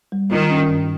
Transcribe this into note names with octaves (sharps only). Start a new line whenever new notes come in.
G3
D#3 F4
C#4
G2